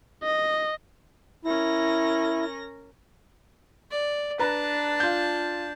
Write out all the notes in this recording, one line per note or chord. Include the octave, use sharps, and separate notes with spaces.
D#5
C#4 E4 A#4 A#6
D5
D4 B4 A5 A#5
F4 G6